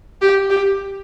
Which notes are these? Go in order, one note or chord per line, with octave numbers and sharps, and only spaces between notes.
G4
G4